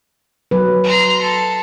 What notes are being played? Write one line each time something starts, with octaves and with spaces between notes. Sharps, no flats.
F#3 B4
A#5 C6
A4